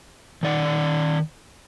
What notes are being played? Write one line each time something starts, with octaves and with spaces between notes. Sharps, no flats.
D#3 D5 F#5